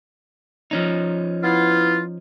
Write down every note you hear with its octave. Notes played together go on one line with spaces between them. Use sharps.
F3 C#4 D#4
B3 E4 F4